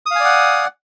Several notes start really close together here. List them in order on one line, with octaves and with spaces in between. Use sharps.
D#6 F5 G#5 D5 F#5